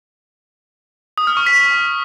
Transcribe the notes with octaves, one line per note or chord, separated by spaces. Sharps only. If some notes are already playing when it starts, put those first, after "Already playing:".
D#6
F6
C#6
B6